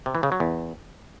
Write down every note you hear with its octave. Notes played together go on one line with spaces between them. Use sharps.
C3
E3
C#3
F#3
E2